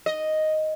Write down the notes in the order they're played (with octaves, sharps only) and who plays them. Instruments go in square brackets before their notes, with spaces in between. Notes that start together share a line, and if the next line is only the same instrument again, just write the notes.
[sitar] D#5